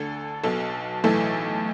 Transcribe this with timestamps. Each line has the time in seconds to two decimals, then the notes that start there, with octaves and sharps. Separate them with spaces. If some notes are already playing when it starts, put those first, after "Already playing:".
Already playing: D2 D3 A4
0.44 B1 B2 A4
1.04 B1 A2 E3 A4